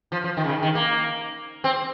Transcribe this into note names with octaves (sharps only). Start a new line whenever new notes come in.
F3
F3
D#3
C#3
D#3
D#3
A#3
C4